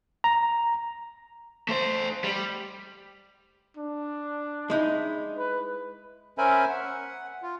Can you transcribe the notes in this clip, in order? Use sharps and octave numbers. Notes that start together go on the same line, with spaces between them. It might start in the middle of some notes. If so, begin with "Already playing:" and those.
A#5
A3 C5
G3
D4
G#3 D#4 E4
B4
C#4 A#4 C5 E5 G#5 B5
F#5
F4